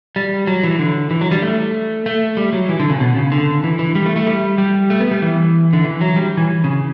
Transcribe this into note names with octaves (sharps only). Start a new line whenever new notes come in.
G3
F#3
E3
D3
E3
F#3
G3
A3
A3
G3
F#3
E3
D3
C#3
B2
C#3
D3
E3
E3
G3
A3
A3
G3
G3
A3
B3
G3
E3
D3
E3
F#3
G3
E3
C#3